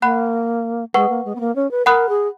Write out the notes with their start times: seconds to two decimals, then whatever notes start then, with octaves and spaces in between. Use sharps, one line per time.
0.02 A#3 F#5 B5 F#6
0.94 G#3 B4 F#5 C#6
1.09 A#3
1.25 G#3
1.35 B3
1.40 A#3
1.56 C#4
1.71 B4
1.86 A#4 F#5 B5 D#6 F#6
2.09 G#4